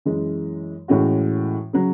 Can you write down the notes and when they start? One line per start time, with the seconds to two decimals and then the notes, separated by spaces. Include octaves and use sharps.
0.05 F#2 E3 G#3
0.88 A2 E3 G#3 C#4 F#4
1.73 C#3 F#3